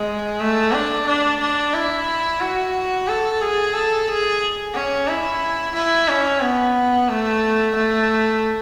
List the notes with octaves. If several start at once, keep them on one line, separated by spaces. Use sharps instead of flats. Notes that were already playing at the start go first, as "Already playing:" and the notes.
Already playing: G#3
A3
D4
D4
D4
E4
F#4
A4
G#4
A4
G#4
C#4
E4
E4
C#4
B3
A3
A3